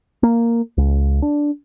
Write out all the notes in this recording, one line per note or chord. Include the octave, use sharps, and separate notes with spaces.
A#3
C#2
D4